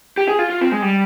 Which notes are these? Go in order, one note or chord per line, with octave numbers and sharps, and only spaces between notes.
G4
G#4
F4
F4
C4
G#3
G3